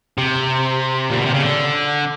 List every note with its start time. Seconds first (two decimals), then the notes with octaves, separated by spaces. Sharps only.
0.18 C3
1.10 A#2
1.19 B2
1.26 C3
1.34 C#3
1.42 D3